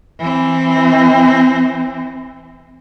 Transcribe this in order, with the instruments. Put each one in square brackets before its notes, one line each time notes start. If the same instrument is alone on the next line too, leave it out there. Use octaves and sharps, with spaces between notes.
[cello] E3 C4